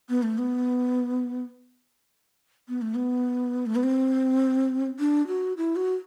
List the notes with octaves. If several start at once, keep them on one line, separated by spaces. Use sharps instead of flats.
B3
A3
B3
B3
A3
B3
A3
B3
C4
D4
F#4
E4
F#4